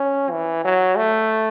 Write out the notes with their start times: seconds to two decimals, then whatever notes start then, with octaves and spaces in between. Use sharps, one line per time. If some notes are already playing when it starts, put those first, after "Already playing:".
Already playing: C#4
0.31 E3
0.65 F#3
0.97 A3